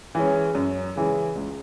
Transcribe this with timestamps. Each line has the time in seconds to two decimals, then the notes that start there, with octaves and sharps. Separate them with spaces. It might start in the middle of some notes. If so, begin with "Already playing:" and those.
0.15 E3 G#3 C#4
0.55 F#2
0.96 C#3 E3 G#3
1.36 C#2